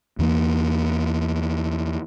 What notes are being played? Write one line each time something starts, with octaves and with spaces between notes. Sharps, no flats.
E2 E3 F#3 A#3